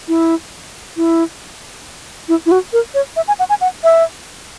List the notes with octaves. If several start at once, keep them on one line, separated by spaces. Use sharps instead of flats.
E4
E4
E4
E4
F#4
A#4
C#5
E5
G#5
F#5
G#5
F#5
E5